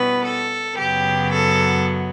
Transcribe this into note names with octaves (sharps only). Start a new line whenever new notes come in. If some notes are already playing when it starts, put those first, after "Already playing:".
Already playing: B2 G3 B3 C#4 E4 B4
A4
F#2 C#3 F#3 B3 G4
A4